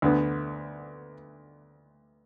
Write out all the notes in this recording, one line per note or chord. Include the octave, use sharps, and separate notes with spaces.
D2 D3 B3